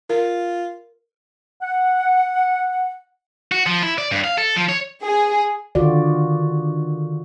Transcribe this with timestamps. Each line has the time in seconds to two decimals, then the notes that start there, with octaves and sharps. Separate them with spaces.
0.10 F4 A#4
1.62 F#5
3.52 F#4
3.66 F3
3.83 E4
3.98 D5
4.12 G2
4.24 F5
4.38 A4
4.56 F3
4.69 C#5
5.04 G#4
5.75 D3 D#3 F4 F#4 D5